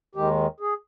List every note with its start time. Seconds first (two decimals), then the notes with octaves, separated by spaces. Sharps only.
0.15 D#2 D#3 G#3 G4
0.60 G#4